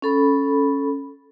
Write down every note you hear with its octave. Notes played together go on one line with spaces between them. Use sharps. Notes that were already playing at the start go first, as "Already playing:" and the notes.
C#4 A4 B5